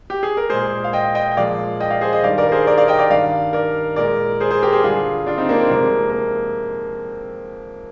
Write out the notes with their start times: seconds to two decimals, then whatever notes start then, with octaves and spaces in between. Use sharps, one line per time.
0.10 G4
0.23 G#4
0.37 A#4
0.50 A#2 G#3 G#4 C5
0.84 F5
0.93 D#5 G5
1.15 D#5 G5
1.32 G5
1.36 A#2 F3 G#3 D5 F5
1.80 D#5 G5
1.90 D5 F5
2.01 G#4 C5
2.13 C5 D#5
2.23 G2 D#3 G3 D5 F5
2.38 A#4 D5
2.49 A#4
2.52 G#4 C5
2.67 A#4 D5
2.78 D5 F5
2.88 D#5 G5
2.99 D5 F5
3.10 G2 D#3 G3 D5 F5
3.53 A#4 D5
3.96 A#2 G#3 A#4 D5
4.40 G#4 C5
4.51 G#4 C5
4.62 G4 A#4
4.72 G#4 C5
4.84 G2 D3 G3 F4 G#4
5.26 D4 F4
5.38 C4 D#4
5.49 A#3 D4
5.60 C4
5.70 F2 C3 F3 G#3 A#3
6.10 A#3